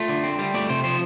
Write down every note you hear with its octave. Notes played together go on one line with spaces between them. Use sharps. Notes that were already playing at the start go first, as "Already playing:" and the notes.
Already playing: A3 F4
D3
C4
G3
A3 D5
C3 C5
F3 C5